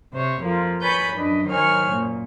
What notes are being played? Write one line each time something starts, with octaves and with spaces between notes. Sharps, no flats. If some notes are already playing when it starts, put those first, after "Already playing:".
C3 C5 C#5
F2 F3 A#3
B4 C#5 G#5 B5 G6 A6
F#2 D4 B4 D#5
D#3 F#3 C5 C#5 G#5 F6
F#2 A#2